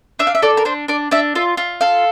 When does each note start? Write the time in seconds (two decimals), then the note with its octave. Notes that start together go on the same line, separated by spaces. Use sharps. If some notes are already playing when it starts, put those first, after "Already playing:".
0.19 D4 E5
0.27 F5
0.35 E5
0.42 A4 D5
0.57 A#4
0.65 D4 C5
0.88 D4 D5
1.11 D4 E5
1.35 F4 E5
1.57 F4
1.81 A4 F5